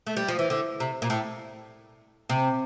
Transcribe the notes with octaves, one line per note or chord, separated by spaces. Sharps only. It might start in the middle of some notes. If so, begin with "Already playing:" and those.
A3
G3
F3
E3
D3
C3
A#2
A2
C3